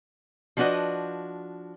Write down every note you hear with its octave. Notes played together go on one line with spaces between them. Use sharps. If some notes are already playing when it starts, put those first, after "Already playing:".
F3 G3 D4 F#4 B4 D#5